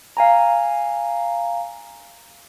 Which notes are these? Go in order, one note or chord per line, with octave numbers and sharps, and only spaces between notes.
F5 G#5 A#5